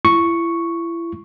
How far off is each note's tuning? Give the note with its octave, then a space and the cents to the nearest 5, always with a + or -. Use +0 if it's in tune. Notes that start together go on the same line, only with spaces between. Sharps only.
E4 +35 C#6 +0